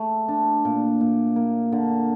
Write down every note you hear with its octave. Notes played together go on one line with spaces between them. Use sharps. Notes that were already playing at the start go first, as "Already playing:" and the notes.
Already playing: A3
D4
A#2
A#2
A#3
D3